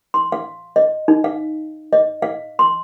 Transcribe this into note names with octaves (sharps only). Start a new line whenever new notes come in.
C6
F5
D#5
D#4
F5
D#5
F5
C6